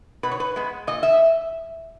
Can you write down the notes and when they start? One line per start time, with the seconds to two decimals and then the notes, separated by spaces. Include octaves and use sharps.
0.23 B2 B4
0.31 C#5
0.40 B4
0.56 G#3 B3
0.87 A#2 D#5
1.03 E5